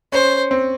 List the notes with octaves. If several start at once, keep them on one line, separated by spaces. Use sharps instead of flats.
C#4 C5
C4